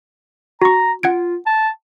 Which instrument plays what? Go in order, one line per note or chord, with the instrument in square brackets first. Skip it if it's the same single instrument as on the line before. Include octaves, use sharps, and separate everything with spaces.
[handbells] F#4 C#6 [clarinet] A#5
[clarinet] F4 [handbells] F#5 G#6 D7
[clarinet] A5